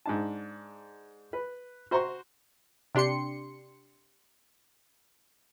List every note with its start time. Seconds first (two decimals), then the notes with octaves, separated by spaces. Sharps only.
0.06 G#2 D4 A5
1.33 B4
1.91 F#4 C5 A#5 C6 C#6
2.95 C3 D4 G4 C6 C#7